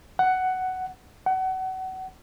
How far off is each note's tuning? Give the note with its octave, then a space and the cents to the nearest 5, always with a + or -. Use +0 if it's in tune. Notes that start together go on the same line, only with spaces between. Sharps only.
F#5 +10
F#5 +30